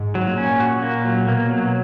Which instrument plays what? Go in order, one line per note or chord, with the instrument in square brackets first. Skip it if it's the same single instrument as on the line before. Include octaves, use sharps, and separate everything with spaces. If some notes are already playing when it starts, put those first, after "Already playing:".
Already playing: [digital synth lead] G#2
[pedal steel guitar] F#3
[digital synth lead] A#2
[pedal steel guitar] C#4
F#4
A#3
F#3
[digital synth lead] B2 [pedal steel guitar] A#3
[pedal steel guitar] F#3
[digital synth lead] B2